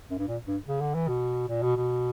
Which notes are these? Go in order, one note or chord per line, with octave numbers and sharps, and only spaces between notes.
F#2
G2
A#2
G2
C#3
D3
E3
B2
A#2
B2
B2